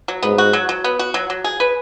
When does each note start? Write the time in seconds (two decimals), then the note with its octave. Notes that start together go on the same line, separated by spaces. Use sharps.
0.08 F#3
0.23 G#2 B3
0.38 F#4
0.53 F#3
0.69 F#3
0.84 B3
0.99 F#4
1.14 F#3
1.30 F#3
1.44 G#4
1.60 B4